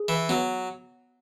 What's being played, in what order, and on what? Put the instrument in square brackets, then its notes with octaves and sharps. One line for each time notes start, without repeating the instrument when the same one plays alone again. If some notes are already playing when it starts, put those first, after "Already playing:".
Already playing: [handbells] G#4
[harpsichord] E3
[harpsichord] F#3 [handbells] B3